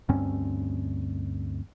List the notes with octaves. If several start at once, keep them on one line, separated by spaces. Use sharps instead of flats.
D2 G2 C4 C#4